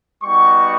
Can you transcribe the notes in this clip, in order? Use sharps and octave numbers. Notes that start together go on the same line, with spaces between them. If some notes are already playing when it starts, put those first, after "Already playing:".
G3 B3 D#4 F#4 C#6